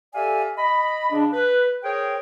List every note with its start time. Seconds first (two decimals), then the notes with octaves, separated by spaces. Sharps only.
0.15 G4 A4 D5 E5 F5 G#5
0.58 D#5 B5
1.11 C#3 D4
1.33 B4
1.84 G#4 A#4 C5 C#5 G5